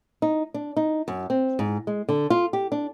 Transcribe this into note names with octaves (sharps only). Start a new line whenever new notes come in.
D#4
D4
D#4
F#2
C4
G#2
G#3
D3
F4
G4
D4